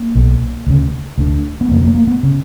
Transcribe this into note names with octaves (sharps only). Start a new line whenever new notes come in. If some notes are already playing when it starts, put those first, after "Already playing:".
Already playing: A#3
B1 B2
D2 C#3
D2 D3
B3
F1 F2 C#3 A#3
A#3
A#3
B3
C#3